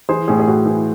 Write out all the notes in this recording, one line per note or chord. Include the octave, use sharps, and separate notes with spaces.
E3 G#4 C5
A2 G#4
G#4
A2 F#4
E3 G#4